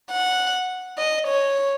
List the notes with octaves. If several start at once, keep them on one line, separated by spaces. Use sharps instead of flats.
F#5
D#5
C#5